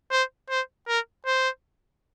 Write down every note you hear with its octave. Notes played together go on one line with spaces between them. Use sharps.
C5
C5
A#4
C5